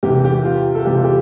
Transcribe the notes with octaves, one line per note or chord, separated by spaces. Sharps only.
E2 C3 E3 G4
G4
F4
A4
E2 C3 E3 G4
F4
G4